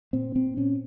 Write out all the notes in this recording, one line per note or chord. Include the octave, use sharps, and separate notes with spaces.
A#2 C4
A#2 C4
A#2 C#4